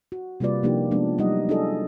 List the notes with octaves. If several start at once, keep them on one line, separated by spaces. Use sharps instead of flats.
F#4
C3 G3 A#3 F4 B4 D5
C3 F3 A#3 D4 D#4 G4
F3 G#3 B3 D4
F#3 G3 D4 D#4 D#5 F#5
D4 E4 F#4 G#4 A4 D#5